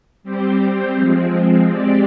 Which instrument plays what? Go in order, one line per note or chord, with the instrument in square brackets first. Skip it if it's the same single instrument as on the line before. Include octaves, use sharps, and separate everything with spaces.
[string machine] G3 C4 G4 C5
F3 G#3 C4
G#3 C4 G4 D5